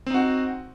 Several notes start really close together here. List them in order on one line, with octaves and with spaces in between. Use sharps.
C4 D#4 F#4